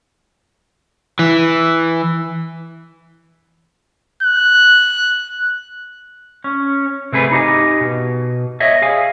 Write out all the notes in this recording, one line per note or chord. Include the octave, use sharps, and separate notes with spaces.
E3
F#6
C#4
C3 A3 G#4 B4
D#4 G4 D#5 G#5
B2
C#5 D#5 E5
G#4 F5 G#5